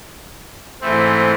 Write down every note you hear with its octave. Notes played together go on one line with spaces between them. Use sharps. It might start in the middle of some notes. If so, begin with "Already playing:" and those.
G#2 E3 A3 C4